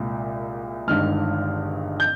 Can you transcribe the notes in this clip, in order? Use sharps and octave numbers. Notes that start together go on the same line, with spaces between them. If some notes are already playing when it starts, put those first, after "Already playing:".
Already playing: C2 A#2 G#3
G1 G2 D#3 G#3 F6
G6